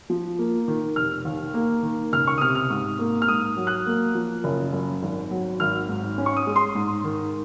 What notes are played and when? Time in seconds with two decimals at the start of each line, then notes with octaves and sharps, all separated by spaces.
0.10 F3
0.39 A#3
0.68 D#3
0.96 F1 F6
1.25 D#2
1.54 A#3
1.83 D#3
2.13 C#2 F6
2.27 C#6
2.38 D#6
2.41 C3 F6
2.55 F6
2.70 G#2
2.99 A#3
3.22 F6
3.28 G#2 D#6
3.57 F#3
3.67 F#6
3.86 A#3
4.15 F3
4.44 F#1
4.73 F#2
5.02 G#1
5.31 F#3
5.60 G#1 F6
5.89 G#2
6.18 C#4
6.26 C#6
6.37 D#6
6.47 G#3
6.56 C6
6.75 G#2
7.04 D#3